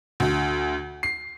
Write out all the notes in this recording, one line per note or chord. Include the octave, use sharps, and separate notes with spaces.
D2
C7